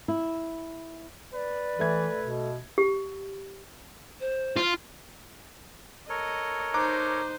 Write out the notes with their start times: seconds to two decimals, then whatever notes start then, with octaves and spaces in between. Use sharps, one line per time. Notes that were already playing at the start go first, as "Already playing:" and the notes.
0.08 E4
1.34 B4 D5
1.79 E3 A3 E5 G#6
2.21 B2
2.78 G4
4.20 C5
4.56 F4
6.09 A4 A#4 C#5 D#5
6.74 D#4 C5 A#5 D6 F#6